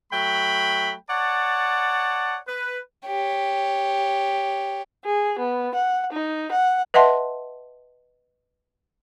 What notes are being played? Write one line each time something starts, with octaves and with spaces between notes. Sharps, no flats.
F#3 A3 G5 B5
C#5 D5 F#5 A5
B4
G4 C#5
G#4
B3
F#5
D#4
F#5
B4 D#5 E5 F#5 A5 C6